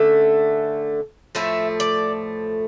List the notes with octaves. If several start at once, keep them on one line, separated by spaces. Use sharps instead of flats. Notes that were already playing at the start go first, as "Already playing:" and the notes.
Already playing: D3 A3 C#4 E5
A2 F3 A3 E5
D5